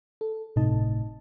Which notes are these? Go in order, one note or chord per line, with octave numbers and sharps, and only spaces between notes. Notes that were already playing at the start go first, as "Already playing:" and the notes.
A4
G1 A2 C3 D#4 D#5 A5